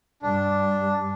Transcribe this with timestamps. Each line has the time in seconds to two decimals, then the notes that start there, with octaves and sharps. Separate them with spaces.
0.22 G2 D4